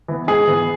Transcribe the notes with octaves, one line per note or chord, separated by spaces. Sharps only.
E3 B3
G#2 G#4
E3 B3